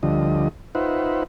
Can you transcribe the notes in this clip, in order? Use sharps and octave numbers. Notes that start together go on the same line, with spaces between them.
D2 D3 F3 G3 D#5
D#4 F4 B4 C5 E5 F#5